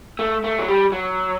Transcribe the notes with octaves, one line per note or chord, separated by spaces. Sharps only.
A3
A3
F#3
G3
F#3